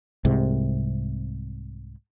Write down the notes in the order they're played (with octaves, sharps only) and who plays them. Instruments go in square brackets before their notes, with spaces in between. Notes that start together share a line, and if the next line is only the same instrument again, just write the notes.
[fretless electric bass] C2 G#2 C3